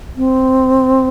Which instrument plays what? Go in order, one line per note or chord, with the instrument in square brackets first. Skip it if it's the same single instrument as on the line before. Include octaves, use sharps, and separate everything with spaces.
[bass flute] C4